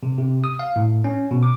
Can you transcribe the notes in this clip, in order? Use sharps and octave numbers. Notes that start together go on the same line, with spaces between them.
C3
C3
D#6
F5
A2
C#4
B2
D6